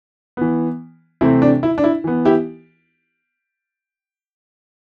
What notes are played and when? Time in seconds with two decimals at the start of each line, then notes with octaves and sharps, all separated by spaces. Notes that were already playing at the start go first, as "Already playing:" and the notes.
0.37 E3 B3
1.21 C3 E3 A3 C4 E4
1.42 D4
1.63 E4
1.78 D4
1.84 E4
2.04 E3 B3
2.25 E4 G4